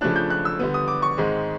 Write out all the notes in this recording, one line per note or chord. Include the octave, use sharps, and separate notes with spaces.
C#3 F3 A3 D4 F#6
G6
F#6
E6
D3 G3 B3
D#6
D6
C#6
G#2 D#3 G#3 C4